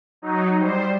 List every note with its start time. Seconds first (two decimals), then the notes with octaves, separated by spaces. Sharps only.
0.22 F#3 D#4
0.58 G3 C5